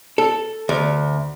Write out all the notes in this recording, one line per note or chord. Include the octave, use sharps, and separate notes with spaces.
A4
D2